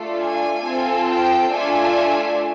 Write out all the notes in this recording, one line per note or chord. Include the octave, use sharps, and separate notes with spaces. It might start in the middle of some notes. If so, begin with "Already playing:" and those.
Already playing: A3 D4 F4 A4
G#5
C4 F4 A4
G5
A3 D4 F4 A4 G#5